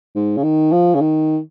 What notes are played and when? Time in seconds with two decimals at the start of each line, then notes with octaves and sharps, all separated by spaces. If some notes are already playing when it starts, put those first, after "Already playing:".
0.15 G#2
0.37 C#3
0.43 D#3
0.72 F3
0.95 C#3
1.01 D#3